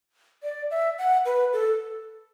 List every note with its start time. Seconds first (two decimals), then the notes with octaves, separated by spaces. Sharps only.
0.43 D5
0.71 E5
0.98 F#5
1.25 B4
1.53 A4